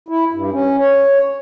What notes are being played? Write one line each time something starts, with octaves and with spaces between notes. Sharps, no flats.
E4
G2
C#4
C#5